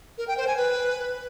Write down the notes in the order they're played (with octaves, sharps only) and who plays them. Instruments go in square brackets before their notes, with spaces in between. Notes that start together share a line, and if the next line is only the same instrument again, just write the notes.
[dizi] A#4
G5
C5
G#5
B4